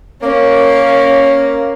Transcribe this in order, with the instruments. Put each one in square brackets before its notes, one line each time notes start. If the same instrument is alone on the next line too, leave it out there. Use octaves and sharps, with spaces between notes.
[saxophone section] A#3 [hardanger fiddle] C#4